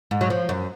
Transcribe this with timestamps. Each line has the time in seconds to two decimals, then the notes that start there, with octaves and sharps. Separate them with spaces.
0.11 G#2
0.21 F#3
0.30 F3
0.49 F#2